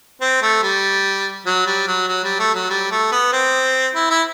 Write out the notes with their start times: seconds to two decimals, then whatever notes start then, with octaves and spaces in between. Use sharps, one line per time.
0.21 C4
0.42 A3
0.63 G3
1.46 F#3
1.66 G3
1.87 F#3
2.08 F#3
2.24 G3
2.39 A3
2.54 F#3
2.70 G3
2.91 A3
3.12 B3
3.32 C4
3.95 E4
4.10 E4